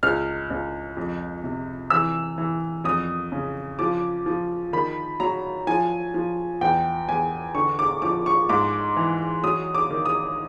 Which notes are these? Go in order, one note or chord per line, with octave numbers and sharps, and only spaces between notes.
C#2 F6
C#2
F2
C3
E3 E6
E3
F2 D#6
C#3
F3 D6
F3
D#3 B5
F#3 A#5
F3 G#5
F3
E2 G5
E2 G#5
D3 C#6
D6
F3 D6
C#6
G#2 D6
E3
F#3 D#6
D6
D#3
D#6